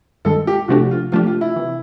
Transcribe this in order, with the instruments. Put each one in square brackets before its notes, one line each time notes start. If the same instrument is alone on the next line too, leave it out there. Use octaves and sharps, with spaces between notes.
[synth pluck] G2 D#3 G#3 [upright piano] A4
[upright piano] G4
[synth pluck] C3 F3 A3 D4 G4 [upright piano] F#4
[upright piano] F4
[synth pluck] C3 F3 A3 D4 G4 [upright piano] F4
[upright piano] F4
E4
[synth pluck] C3 E3